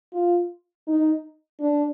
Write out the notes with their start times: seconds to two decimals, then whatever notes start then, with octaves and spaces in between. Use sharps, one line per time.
0.13 F4
0.88 D#4
1.60 D4